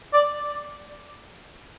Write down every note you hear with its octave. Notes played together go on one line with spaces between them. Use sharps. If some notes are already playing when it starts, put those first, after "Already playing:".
D5